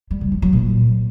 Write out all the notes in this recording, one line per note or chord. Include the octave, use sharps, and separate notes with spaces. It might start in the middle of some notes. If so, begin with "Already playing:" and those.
G3
C#3
F3
F#3
A#2